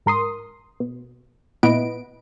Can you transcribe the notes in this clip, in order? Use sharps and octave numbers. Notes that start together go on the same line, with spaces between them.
G#2 A#4 C6 D#6
B2
A#2 B3 E4 B4 D#5 D7